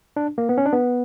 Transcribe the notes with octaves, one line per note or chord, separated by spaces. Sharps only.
D4
A#3
B3
C#4
D4
B3